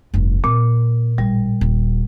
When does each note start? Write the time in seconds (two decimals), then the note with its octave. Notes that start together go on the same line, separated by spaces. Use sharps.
0.14 F1 G2
0.44 A#2 C4
1.18 A1 G3
1.61 D#1